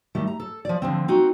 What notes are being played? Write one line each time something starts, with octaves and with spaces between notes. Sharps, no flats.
D#3 G3 A3
A#5
A4
F3 D5
D3 F3 C4
C4 D#4 F#4